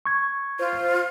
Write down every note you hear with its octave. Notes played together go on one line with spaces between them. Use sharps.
C#6 G#6
F4 C5